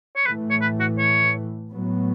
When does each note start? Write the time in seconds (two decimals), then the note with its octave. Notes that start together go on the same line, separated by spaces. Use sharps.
0.16 C#5
0.26 A2 E3 A3 B4
0.51 C#5
0.61 B4
0.80 F#4
0.98 C#5
1.70 A2 F#3 B3